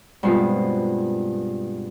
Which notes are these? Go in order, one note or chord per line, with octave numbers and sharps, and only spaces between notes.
G2 B2 G#3 C4 F4